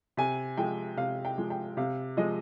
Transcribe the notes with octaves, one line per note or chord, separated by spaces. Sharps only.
C3 G#5
F3 G#3 G5
C3 F5
G5
F3 G#3
G5
C3 F5
F3 G#3 D#5